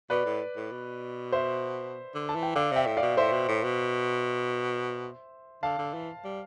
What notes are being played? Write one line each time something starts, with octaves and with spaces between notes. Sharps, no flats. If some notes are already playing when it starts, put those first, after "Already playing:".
B2 B4 D5
A2
A2
B2
C5 E5
D3
A5
E3
G5
D3 D5 F5
C3 E5 G5
A2
D5 F5
B2
A2 C5 E5
B2
A2
B2
D3 F5 A5
D3
E3
G3